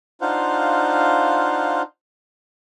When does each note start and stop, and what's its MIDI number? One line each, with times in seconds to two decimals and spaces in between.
0.21 1.82 62
0.21 1.82 63
0.21 1.82 65
0.21 1.82 72
0.21 1.82 77
0.21 1.82 78